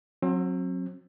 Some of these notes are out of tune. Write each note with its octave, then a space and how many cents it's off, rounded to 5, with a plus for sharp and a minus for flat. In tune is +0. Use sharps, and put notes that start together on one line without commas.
F#3 -20 C4 +35